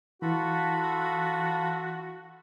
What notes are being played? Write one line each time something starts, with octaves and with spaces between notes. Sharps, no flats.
E3 F4 F#4 A4 B5